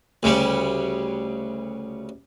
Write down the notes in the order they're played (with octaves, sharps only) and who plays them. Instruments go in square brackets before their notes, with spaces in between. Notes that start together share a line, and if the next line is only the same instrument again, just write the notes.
[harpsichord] D2 C#3 G3 C#4